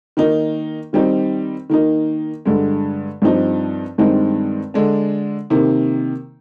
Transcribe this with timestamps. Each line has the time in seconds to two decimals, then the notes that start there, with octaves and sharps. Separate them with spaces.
0.17 D#3 A#3 D#4
0.93 D#3 G3 C4 D#4
1.70 D#3 A#3 D#4
2.45 G2 D3 G#3
3.22 G2 F3 C4 D#4
3.98 G2 D#3 G#3 C4 D#4
4.74 D3 G#3 D4
5.50 C3 D#3 A#3